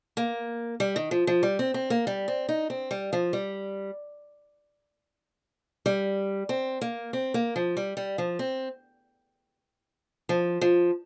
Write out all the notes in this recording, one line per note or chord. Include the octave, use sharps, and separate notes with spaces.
A#3
G3
D#3
F3
F3
G3
C4
C4
A#3
G3
C4
D#4
C4
G3
F3
G3
G3
C4
A#3
C4
A#3
F3
G3
G3
F3
C4
F3
F3